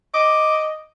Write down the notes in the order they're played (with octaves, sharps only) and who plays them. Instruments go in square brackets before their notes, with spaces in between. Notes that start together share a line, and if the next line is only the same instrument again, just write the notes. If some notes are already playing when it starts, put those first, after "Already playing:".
[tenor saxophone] D#5 [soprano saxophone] D6